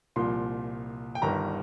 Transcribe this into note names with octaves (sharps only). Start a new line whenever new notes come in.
C2 A#2 F3 C6
G5
G1 G2 D#3 A#5